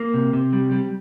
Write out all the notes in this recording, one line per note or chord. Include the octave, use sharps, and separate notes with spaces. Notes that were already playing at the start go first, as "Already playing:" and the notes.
Already playing: A#3
C3
C3
G3
G3